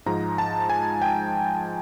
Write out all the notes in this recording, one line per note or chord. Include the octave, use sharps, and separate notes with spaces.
G#2 F3 G#3 A#5
A5
G#5
G5